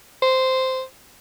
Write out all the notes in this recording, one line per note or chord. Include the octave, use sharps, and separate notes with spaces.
C5